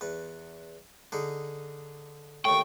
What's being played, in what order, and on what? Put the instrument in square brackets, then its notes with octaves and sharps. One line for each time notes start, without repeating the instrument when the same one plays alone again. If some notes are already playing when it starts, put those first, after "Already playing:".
[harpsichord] E2 B4
D3 D#4 G#4
[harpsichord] D#2 A2 [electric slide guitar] G5 [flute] C#6